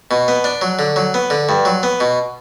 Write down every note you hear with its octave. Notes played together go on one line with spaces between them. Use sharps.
B2
B3
D4
F#3
D3
F#3
B3
D3
G2
F#3
B3
B2